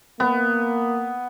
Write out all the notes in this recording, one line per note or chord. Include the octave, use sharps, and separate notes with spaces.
A#3 B3